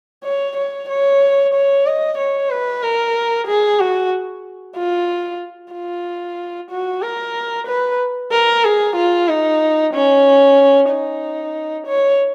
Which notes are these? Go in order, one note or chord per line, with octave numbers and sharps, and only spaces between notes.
C#5
C#5
C#5
C#5
D#5
C#5
B4
A#4
G#4
F#4
F4
F4
F#4
A#4
B4
A#4
G#4
F4
D#4
C#4
D#4
C#5